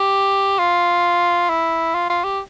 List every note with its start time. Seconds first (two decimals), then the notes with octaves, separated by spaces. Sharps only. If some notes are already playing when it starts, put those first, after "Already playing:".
Already playing: G4
0.59 F4
1.49 E4
1.95 F4
2.10 F4
2.24 G4